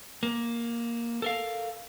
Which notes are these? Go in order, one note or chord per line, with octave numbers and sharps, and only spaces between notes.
A#3
A4 A#4 F5